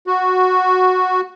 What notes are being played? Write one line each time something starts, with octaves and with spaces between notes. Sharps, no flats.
F#4